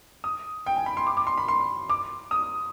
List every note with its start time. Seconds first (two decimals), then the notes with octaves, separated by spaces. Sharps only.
0.24 D#6
0.66 G5
0.76 G#5
0.86 B5
0.97 C6
1.07 D6
1.17 D6
1.27 C6
1.37 B5
1.48 C6
1.89 D6
2.31 D#6